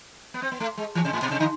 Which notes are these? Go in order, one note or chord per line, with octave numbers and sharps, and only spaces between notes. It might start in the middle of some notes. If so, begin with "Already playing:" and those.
B3
C4
B3
A3
G#3
E3
C3
A2
B2
C3
D3